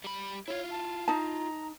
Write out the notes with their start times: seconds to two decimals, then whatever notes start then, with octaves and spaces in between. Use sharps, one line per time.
0.04 G3 B5
0.48 E4 F4 C#5
0.71 A5
1.08 D#4 A5 A#5